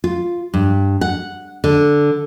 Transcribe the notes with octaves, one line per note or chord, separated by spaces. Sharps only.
F4
G2
F#5
D3